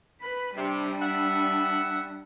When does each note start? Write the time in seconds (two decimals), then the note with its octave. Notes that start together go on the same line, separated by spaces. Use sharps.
0.21 B4 B5
0.56 C3 G3 D4
1.01 E5 F#5